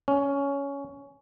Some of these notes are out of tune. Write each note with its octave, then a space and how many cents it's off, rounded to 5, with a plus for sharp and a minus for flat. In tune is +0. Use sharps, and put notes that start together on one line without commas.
C#4 +15